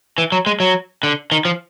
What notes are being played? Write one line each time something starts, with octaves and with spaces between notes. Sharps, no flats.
E3
F#3
G#3
F#3
D3
D#3
F3